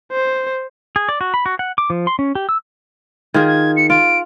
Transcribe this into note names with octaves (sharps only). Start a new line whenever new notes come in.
C5
G#4
D5
F#4
B5
F#4
F#5
D6
F3
C6
C#4
G4
E6
D#3 F4 G#4 G#6
G#6
C#7
F4 D7